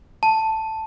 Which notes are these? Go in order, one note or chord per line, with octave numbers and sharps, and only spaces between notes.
A5